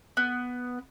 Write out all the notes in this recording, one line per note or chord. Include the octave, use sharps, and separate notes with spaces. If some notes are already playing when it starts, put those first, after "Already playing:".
B3